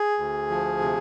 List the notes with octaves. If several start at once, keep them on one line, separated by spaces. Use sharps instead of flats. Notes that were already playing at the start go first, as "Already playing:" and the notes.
Already playing: G#4
D2
F3
C3